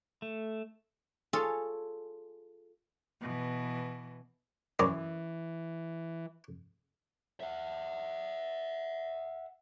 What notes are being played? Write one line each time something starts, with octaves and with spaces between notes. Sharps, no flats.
A3
F4 G#4 A4 C#5
B2 E3
F#2 E3 D5 D#5
E5 F#5